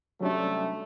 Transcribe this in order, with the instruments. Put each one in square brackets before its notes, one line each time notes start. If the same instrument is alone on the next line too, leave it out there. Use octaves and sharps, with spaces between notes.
[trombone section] C3 G3 A3 [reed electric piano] F#3 C#4 D4